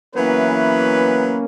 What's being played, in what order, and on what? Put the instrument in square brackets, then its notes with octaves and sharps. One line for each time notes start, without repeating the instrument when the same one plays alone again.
[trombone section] E3 [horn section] F#3 B3 B4 [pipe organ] A#3 C#4